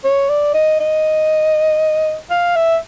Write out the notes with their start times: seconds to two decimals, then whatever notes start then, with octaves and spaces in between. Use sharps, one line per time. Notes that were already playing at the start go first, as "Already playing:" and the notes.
0.04 C#5
0.29 D5
0.54 D#5
0.80 D#5
2.30 F5
2.56 E5